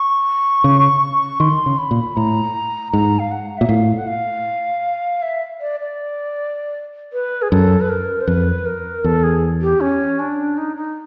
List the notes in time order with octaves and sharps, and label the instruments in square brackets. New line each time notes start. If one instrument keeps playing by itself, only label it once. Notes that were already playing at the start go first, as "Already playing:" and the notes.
Already playing: [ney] C#6
[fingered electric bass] C#3
[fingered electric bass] D#3 [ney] C6
[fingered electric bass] C#3
[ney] B5
[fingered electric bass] A#2
[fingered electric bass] A2 [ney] A#5
[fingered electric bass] G#2 [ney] A#5
[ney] F5
F#5
[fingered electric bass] A#2 [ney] E5
[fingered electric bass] A2 [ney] F5
[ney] F#5
F5
E5
D5
D5
B4
G#4
[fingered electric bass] F#2 [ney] A4
[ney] B4
A#4
C5
[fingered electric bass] F2 [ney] B4
[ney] A#4
[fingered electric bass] E2 [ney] A4
[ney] G#4
G4
C#4
D4
D#4
D#4